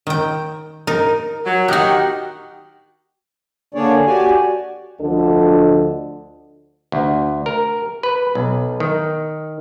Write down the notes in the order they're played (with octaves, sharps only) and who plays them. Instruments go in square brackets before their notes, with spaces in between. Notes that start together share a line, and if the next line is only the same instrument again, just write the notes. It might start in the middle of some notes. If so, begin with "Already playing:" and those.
[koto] D#3 G5
[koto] D#4 [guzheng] A#4
[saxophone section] F#3
[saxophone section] D#3 D#4 F#5 [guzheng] F#4 G4
[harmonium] D3 A#3 D4 G#4 C#5 D5
F#4 G4 D5 G#5
[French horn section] D2 D3 F3 D4 A4 D#5
[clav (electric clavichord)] D2
A#4
B4
B1
D#3